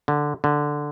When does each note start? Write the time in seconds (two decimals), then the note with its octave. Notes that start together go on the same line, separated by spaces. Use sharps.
0.08 D3
0.44 D3